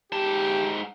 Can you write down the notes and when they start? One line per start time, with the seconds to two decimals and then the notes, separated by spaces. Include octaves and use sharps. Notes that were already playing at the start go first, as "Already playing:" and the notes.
0.12 G#2 G4 A5